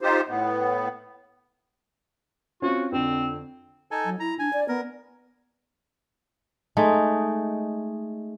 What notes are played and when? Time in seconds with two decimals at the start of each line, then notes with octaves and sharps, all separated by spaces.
0.01 D#4 F4 G4 C5
0.29 A2 B3
2.62 C4 C#4 F4 F#4
2.92 F2 D3 C4
3.91 D#4 A4 G#5
4.05 F#3
4.20 E4 A#5
4.39 D4 G#5
4.53 D5
4.69 B3 A#4
6.77 G#3 A3 D#4